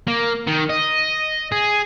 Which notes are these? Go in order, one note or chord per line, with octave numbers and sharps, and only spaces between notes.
A#3
D#3
D#5
G#4